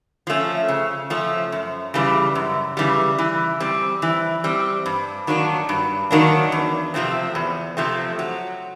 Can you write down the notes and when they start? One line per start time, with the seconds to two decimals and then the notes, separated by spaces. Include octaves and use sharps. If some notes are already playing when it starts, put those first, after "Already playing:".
0.27 F3 A3 C#4
0.68 C#3
1.10 F3 A3 C#4
1.52 F#2
1.94 C#3 E3 G3
2.35 F#2
2.77 C#3 E3 G3
3.18 E3
3.60 G3 C4
4.02 E3
4.44 G3 C4
4.86 G2
5.27 D#3 F#3 A#3 D4
5.69 G2
6.11 D#3 F#3 A#3 D4
6.52 E2
6.94 C3 F3 A3 C4
7.35 E2
7.77 C3 F3 A3 C4
8.19 F#3